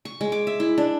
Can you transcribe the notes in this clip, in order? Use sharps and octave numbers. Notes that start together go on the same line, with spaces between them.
C#6
G#3
D6
E5
E4
D4